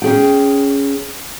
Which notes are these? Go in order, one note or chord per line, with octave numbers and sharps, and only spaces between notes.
C#4 G#4 G5